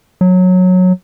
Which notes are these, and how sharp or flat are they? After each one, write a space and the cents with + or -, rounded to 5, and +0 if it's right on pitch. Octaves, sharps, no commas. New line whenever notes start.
F#3 -15